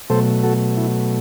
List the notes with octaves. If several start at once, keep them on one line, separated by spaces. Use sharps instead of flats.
B2 F#3 A3 A4 C5
F#4 A4
E4